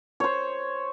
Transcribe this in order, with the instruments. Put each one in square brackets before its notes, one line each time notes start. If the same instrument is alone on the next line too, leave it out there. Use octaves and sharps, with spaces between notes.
[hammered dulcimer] C5 C#5